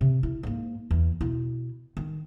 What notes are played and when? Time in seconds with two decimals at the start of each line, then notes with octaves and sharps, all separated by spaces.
0.01 C3
0.23 E4
0.43 G#2 A#3
0.91 E2
1.21 B2 E4
1.97 D#3